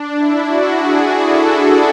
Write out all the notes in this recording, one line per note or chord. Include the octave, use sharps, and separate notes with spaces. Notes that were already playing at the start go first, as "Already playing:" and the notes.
Already playing: D4
E4
F#4
G#4
A4